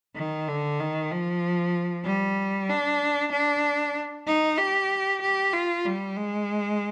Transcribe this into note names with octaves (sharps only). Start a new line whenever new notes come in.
D#3
D3
D#3
F3
G3
D4
D4
D#4
G4
G4
F4
G3
G#3